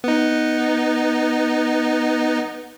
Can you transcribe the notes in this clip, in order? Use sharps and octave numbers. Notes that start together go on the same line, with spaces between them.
B3 D#4